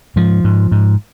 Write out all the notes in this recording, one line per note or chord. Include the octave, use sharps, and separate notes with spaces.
G#2 F3
G#2
G#2